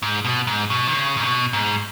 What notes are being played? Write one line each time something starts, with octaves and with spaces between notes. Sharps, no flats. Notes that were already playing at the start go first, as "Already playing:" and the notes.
G#2
B2
G#2
B2
D#3
C#3
G#2
B2
G#2